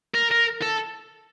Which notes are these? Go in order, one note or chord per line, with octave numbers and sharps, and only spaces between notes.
A#4
A#4
A4